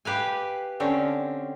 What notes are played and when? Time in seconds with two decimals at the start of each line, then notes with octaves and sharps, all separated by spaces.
0.05 G4 B4 F5 G#5
0.80 D3 C4 C#4